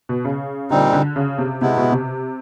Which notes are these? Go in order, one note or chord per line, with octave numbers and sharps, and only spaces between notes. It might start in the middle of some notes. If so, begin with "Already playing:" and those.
B2
C#3
A#2 D3 G3 C4 D#4
D3
C#3
C3
C3 G#3 B3 E4
B2
C3